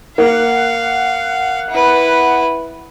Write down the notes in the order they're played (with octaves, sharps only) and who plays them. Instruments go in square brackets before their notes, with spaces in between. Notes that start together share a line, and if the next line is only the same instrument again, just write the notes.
[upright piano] A#3 [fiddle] F5 [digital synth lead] F#5
[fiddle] E4 B4